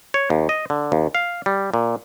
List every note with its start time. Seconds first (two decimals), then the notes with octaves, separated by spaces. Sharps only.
0.14 C#5
0.30 D#2
0.49 D#5
0.70 D3
0.92 D#2
1.15 F5
1.46 G3
1.74 A#2